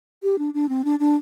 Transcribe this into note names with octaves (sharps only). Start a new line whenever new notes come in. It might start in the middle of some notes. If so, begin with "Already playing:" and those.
G4
D4
D4
C4
D4
D4